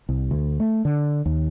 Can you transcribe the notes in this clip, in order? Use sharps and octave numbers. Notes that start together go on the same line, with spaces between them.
C2
D2
A3
D3
D#2